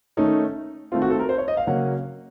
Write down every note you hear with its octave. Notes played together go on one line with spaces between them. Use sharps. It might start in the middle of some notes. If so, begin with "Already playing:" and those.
D#3 A3 C#4 D#4
D#3 A3 C4 F4
F#4
A4
A#4
C5
C#5
D#5
F5
C#3 F#3 A#3 C#4 F#5